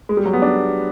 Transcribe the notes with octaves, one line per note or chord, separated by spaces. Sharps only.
G#3
G3
F#3
B3
D4